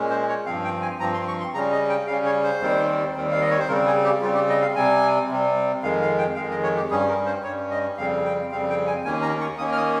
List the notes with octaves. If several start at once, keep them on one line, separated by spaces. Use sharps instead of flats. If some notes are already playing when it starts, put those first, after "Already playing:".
Already playing: A#2 G#3 C#4
C5
C#5
G2 F3 C4 F5
G5
G#5
G2 F3 C4 A#5
C6
C#6
C6
C#3 G3 C#4 A#5
D#5
G5
C#3 G3 C#4 F5
C#5
C5
D#2 D#3 G3 C4
D#2 D#3 G3 C4
F5
D#5
C#5
C5
C#3 G3 C4 A#4
G#4
G4
C#3 G3 C4 F4
G4
D#5
F5
C3 G3 C4 G#5
C3 G3 C4
F2 D#3 G#3 F5
F5
G5
F2 D#3 G#3 F5
D#5
C#5
G4
G2 G3 C#4 G#4
A#4
C5
G2 G3 C#4 C#5
D#5
F2 C#3 G3 C4 F5
G5
F2 C#3 G3 C4 F5
G5
G#5
D#2 D#3 A#3 C#4 G#5
A#5
C#6
D#2 D#3 A#3 C#4 D#6
F6
D#6